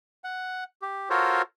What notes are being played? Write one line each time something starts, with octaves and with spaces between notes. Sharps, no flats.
F#5
G4
F4 F#4 A4 A#4 C5 C#5